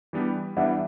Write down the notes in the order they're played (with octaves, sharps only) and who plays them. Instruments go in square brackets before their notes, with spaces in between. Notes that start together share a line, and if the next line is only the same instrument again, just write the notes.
[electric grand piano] E3 G3 B3 D4 G4
[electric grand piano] E3 G3 B3 D4 G4 [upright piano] E5 F#5